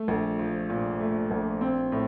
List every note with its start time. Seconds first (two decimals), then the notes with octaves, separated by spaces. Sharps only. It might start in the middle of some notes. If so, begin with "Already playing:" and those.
Already playing: A3
0.08 A#1
0.39 F3
0.70 A#2
1.00 A3
1.31 A#1
1.61 C4
1.92 A2